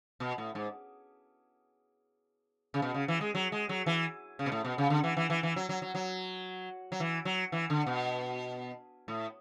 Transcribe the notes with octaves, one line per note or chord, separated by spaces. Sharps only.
B2
A2
G#2
C#3
B2
C#3
E3
G#3
F#3
G#3
F#3
E3
C#3
B2
A2
B2
C#3
D3
E3
E3
E3
E3
F#3
F#3
F#3
F#3
F#3
E3
F#3
E3
D3
B2
A2